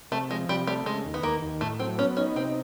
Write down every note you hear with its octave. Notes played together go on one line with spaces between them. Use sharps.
C3 A3
F3 G#3
C3 G3
G3 A3
C#3 G#3
D#2
B3
D#2 A#3
D#2
A2 A3
F#3 C4
B3 C#4
C#4 D#4
C3 C4